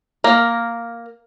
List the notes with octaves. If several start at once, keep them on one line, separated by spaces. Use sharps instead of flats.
A#3 A#4